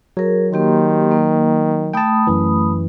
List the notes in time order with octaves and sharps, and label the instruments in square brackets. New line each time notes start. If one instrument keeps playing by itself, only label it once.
[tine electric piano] F#3 [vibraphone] G#4 A#4
[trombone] D#3 [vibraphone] A#3 G4 C6
[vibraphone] A#3
[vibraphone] A3 B5 D#6 [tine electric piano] G5 A5
[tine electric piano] F#2 E3